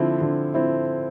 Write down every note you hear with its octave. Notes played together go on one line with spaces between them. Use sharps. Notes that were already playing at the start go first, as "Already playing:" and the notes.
Already playing: D3 F3 C4 E4
D3
F3 C4 E4